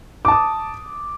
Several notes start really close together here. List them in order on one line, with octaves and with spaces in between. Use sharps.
D6 A5 D#6